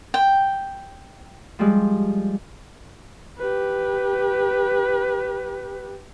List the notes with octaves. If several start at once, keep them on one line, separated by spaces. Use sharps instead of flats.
G5
F3 G3 G#3
G4 B4